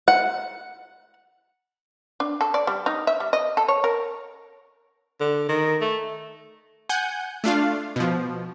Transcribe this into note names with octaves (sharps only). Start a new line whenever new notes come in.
F#5
D4
A4
D5
G3
D#4
E5
G3
D#5
A4
C#5
A#4
D3
D#3
A3
F#5 G#5 G6
A3 D4 F4 F5
B2 F3